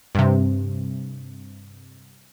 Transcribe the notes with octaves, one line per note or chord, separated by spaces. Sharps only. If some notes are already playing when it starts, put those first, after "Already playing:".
G2 C3